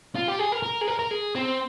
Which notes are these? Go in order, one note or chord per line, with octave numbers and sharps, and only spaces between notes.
F4
G4
G#4
A#4
A#4
G#4
A#4
A#4
G#4
C4